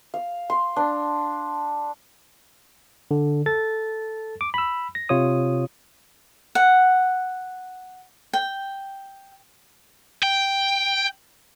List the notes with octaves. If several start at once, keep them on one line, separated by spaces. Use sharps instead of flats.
F5
C6
D4
D3
A4 A6
D6
B5 E6
A#6
C3 F4 C#5 D#6
F#5
G5
G5